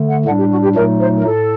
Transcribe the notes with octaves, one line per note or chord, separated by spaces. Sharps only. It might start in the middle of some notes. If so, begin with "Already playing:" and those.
Already playing: D3 A3
F#5
A2 G3 D4 F#5
G4
F#4
G4
A#2 F#3 A3 D#4 A#4
C5
A#4
A2 A4